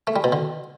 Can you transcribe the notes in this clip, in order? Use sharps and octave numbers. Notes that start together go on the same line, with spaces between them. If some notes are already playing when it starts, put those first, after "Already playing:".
A3
G3
B2
D3